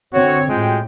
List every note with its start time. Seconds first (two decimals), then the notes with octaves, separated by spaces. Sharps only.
0.14 D3 C4 F#4 C#5
0.49 A2 G#3 F4 F#4 G5